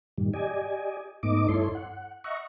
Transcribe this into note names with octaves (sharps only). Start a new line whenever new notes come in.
G2 A#2 D#3 G3
G4 D5 D#5 G#5
G#2 A3 B3 D#4 D#5 D6
G2 E4 A4 C#5 C6
F#5
D#5 E5 F#5 A#5 C#6